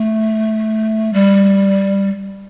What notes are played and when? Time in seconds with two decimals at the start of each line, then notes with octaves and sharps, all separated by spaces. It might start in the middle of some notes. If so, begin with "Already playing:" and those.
Already playing: A3
1.13 G3